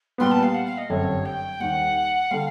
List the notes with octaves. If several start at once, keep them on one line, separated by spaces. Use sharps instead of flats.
A#2 G3 B3 C6
A5
F5
F#5
F5
D#5
G1 F#2 D3 G3 C4 C#5
G5
D#2 D#3 G3 F#5
D3 G3 F5